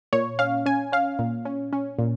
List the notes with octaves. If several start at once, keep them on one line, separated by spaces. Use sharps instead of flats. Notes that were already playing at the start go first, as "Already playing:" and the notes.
A#2 C#5
C#4 F5
C#4 G#5
C#4 F5
A#2
C#4
C#4
A#2